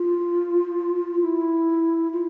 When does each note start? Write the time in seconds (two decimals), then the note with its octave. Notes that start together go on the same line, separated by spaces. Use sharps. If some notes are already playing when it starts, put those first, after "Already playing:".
Already playing: F4
1.21 E4
2.12 F4